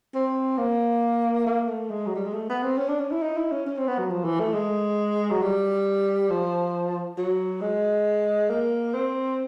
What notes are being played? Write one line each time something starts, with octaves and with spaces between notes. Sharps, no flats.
C4
A#3
A#3
A3
G#3
F#3
G3
G#3
A3
B3
C4
C#4
D4
C#4
E4
D#4
E4
C#4
C#4
C4
B3
F#3
F3
E3
A3
G#3
F#3
G3
F3
F#3
G#3
A#3
C4